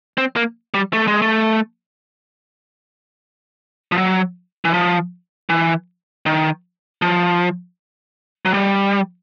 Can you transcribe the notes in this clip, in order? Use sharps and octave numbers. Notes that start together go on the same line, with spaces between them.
C4
A#3
G3
A3
G#3
A3
F3
F#3
E3
F3
E3
D#3
F3
F#3
G3